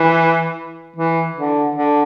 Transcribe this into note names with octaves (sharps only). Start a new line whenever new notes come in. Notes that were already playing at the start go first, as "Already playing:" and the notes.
Already playing: E3
E3
D3
D3